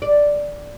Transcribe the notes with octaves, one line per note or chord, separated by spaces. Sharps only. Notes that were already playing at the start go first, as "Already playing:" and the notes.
D5